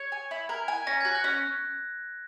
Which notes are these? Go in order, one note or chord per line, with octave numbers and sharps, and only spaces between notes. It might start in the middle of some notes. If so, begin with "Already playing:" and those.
Already playing: C#5 G#6
G#5
E4
A#4
G#5
C#4 A#6
F#4 G#6
F#6
C#4